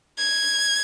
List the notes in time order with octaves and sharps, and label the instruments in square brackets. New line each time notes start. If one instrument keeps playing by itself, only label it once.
[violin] G#6